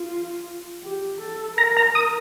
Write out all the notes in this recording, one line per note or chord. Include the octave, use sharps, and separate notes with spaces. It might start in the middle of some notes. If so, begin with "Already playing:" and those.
Already playing: F4
G4
A4
A#4 A#5
A#5
D#6